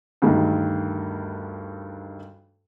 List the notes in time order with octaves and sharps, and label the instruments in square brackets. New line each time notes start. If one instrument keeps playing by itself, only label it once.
[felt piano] D2 G2 D#3